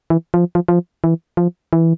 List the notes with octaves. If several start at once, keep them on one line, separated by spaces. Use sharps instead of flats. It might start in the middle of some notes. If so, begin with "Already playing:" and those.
E3
F3
F3
F3
E3
F3
E3